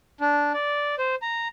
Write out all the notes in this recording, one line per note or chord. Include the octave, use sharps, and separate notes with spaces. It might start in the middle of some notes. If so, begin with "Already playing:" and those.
D4
D5
C5
A#5